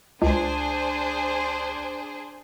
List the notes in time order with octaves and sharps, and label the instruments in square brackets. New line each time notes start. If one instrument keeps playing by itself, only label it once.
[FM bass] C#2 [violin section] D4 G#4 C5